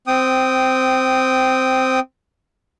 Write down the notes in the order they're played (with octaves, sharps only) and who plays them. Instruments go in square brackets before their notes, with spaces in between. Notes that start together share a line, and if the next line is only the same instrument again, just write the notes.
[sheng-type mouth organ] C4 G5 D#6